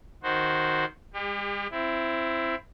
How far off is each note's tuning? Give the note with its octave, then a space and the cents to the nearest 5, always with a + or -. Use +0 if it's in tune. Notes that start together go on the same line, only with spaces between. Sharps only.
D#3 +0 F#4 +0 C5 +0
G#3 -45 G4 +35
C4 +0 E4 +15